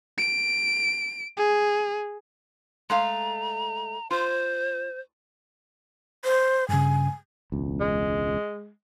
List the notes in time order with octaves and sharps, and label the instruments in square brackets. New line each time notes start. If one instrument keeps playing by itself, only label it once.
[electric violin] D7
G#4
[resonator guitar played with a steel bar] G#3 A3 F5 [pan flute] A#5
[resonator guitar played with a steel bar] F4 [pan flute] C5
[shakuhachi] C5
[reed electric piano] G2 C#3 [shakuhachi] G#5
[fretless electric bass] E1 C#2
[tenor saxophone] G#3